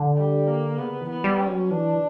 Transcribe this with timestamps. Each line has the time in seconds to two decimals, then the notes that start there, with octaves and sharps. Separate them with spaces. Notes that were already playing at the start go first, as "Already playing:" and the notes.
Already playing: D3
0.16 G3
0.47 A#3
0.78 C#3 B3
1.01 E3
1.09 B3
1.24 G3
1.40 C#4
1.48 F#3
1.71 E3 D4